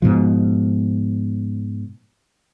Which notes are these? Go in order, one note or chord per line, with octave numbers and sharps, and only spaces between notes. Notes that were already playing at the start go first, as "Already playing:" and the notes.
G#2 B2 F3